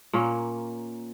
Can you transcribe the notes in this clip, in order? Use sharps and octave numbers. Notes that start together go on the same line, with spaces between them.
A#2 A#3 C#4